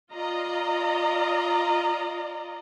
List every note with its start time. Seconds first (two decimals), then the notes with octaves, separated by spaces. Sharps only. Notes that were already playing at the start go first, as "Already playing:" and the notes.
0.12 F4 D5 D#5 A#5